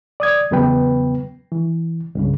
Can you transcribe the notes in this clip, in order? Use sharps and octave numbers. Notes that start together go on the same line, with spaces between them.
D5 D#6 G#6
E2 C#3 F#3 B3 B4 G5
E3
C2 G2 C#3